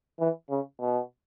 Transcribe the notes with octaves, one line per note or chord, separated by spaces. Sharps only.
E3
C#3
B2